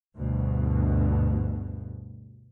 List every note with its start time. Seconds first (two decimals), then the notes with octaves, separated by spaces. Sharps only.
0.18 D2 G2 B2